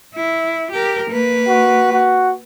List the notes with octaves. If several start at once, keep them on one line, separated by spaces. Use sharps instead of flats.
E4
G4 A#4
A#3 B4
F#4
F#4